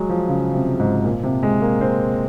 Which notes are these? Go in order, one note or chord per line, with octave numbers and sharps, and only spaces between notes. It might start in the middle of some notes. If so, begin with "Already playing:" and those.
Already playing: F#3 G#3
F3
C#3
C3
G#2
A#2
C3
G#3
A#3
C4